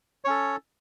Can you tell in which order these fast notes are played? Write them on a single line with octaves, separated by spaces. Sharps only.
C#5 C#4 A4